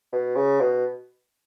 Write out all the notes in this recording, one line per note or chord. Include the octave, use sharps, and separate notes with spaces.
B2
C#3
B2